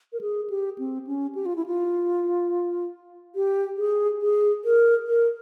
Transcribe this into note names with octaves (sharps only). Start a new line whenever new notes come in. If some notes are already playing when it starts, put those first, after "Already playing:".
A#4
G#4
G4
C4
C#4
G4
F4
E4
F4
G4
G#4
G#4
A#4
A#4